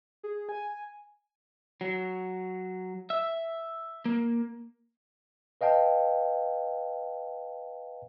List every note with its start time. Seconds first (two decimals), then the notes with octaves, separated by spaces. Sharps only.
0.24 G#4
0.49 G#5
1.81 F#3
3.10 E5
4.06 A#3
5.61 B4 D#5 F5 G5 A5